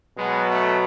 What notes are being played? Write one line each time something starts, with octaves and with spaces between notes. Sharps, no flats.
B2 F#3 G#3 B3
A3